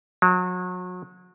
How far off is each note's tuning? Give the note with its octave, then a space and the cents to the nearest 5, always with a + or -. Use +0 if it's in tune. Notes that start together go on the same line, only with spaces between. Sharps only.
F#3 -35